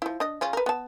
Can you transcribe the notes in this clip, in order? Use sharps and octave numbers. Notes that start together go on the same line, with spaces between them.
F3 E4
D4 D#5
C#3 C#4 F4
A#4 B4
B3 A5